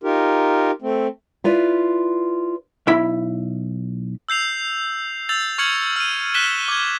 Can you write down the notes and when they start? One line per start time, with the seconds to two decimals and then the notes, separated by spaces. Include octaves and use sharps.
0.03 D#4 F4 G4 A#4
0.82 A3 C4
1.44 E4 F4 B4 D5
2.87 B1 E4 B5
4.29 E6 G6 C7 F7
5.29 E6 G6 A6 F7
5.58 C#6 F6 G#6 C#7 F#7
5.96 F6 D#7
6.34 F#6 B6 D#7 E7 G7
6.68 D6 G#6